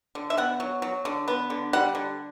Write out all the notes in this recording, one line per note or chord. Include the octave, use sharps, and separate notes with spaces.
D3
E5
B3 F#5
F#3
F#3
D3
B3
D3
G3 F#5
D3